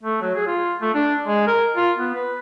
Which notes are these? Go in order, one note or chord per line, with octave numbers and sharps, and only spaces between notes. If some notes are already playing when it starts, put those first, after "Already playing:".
A3
F#3
G#4
F4
A3
D4
G#3
A#4
F4
B3
B4